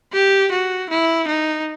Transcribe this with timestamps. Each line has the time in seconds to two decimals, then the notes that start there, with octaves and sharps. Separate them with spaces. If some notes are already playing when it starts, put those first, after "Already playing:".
0.13 G4
0.52 F#4
0.90 E4
1.28 D#4